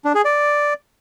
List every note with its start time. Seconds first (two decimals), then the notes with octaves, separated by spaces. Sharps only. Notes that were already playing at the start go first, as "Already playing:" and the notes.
0.05 D4
0.15 G#4
0.25 D5